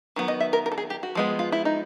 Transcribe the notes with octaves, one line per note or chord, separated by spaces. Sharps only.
D#3 F#3 B3
D#5
E5
A#4
A#4
A4
G#4
G4
F#4
F3 G#3 B3
F4
E4
D#4